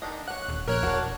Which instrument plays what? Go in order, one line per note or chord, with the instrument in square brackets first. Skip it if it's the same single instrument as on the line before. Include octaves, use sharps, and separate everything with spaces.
[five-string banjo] D#3 D4 D#5
[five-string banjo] C#5 F#5 [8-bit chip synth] F#6
[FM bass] D#1
[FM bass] A#1 [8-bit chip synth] A#4 C#5 F#6
[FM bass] E1 [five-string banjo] D4 F#4